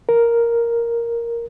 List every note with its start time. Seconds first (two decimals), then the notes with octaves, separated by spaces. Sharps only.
0.09 A#4